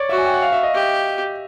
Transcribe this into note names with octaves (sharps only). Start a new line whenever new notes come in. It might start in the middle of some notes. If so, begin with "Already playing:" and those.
Already playing: C#5 D5
F#4 E5
G#5
G5
F#5
F5
E5
D#5
G4